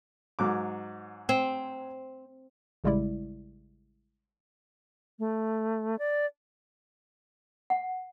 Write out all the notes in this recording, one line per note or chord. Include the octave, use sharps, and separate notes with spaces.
G#2 F#3 D6
C4
A1 C#3 G3 G#3 E4 D5
A3
D5
F#5